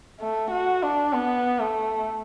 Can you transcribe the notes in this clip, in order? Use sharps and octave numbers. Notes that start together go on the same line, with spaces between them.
A3
F#4
D4
B3
A3